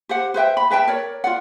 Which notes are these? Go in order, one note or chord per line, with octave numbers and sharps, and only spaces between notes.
G4 C5 F#5
B4 C5 E5 G5
B5
B4 E5 G5 A5
A#4 C#5 D5
F4 D5 F#5